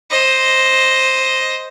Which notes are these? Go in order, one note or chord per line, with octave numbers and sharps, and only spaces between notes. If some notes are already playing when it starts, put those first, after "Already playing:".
C5 D#5